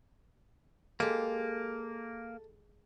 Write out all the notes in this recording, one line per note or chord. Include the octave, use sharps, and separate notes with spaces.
G#3 A#3 G4 A4